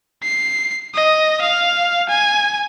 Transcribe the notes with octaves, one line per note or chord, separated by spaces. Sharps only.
C7
D#5
F5
G#5